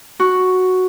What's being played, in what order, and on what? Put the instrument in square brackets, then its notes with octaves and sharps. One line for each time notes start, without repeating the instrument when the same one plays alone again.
[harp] F#4